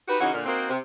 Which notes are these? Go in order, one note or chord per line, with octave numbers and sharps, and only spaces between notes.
D#4 F#4 G4 B4
C#3 E3 C#4 D#4 F#4
A#2 D3
A#3 C4 D#4 F#4 A#4 C5
C3